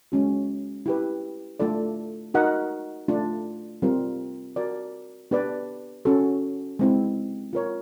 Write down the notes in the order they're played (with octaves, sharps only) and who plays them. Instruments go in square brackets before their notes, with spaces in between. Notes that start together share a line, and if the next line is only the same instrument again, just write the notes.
[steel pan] G#3 C#4 F#4
E4 G4 B4
A3 D4 F4 A4 D5
D#4 F#4 A#4 D#5 F#5
A3 D4 F4
G3 C4 F4 A#4
F#4 A#4 D5
B3 D4 G4 B4 D5
C#4 F#4 A4
G#3 C4 E4
F4 A#4 C#5